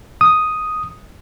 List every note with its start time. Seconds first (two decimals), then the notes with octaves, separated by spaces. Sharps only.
0.21 D#6